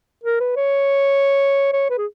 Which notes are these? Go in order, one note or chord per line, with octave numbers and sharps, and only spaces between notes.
A#4
B4
C#5
C#5
B4
G#4